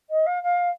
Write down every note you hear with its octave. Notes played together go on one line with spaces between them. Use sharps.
D#5
F5
F5